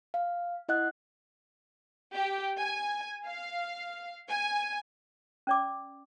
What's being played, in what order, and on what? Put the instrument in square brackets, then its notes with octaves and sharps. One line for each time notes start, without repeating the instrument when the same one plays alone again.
[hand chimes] F5
E4 D#5 F#5 F#6
[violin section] G4
G#5
F5
G#5
[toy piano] C#4 D5 D6